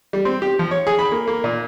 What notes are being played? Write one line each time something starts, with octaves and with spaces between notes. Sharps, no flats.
G3
C4
G4
F3
C#5
G#4
B5
A#3
A#3
A#2